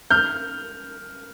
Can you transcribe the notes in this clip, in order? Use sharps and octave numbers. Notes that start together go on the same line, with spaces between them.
F6 G6